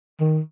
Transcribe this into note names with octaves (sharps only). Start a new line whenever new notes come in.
D#3